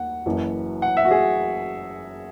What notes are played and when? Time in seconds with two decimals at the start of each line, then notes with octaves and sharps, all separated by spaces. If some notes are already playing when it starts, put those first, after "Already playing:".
Already playing: D#2 F#5
0.26 F#1 F#2 E3
0.82 F#5
0.97 E5
1.05 F#4
1.11 G#4